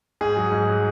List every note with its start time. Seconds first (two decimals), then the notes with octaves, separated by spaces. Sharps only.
0.21 G#2 G#4
0.36 F#3
0.52 G#2
0.69 F#3